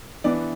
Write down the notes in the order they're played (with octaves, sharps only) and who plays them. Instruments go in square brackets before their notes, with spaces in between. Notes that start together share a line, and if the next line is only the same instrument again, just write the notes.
[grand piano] E3 B3 D4 D5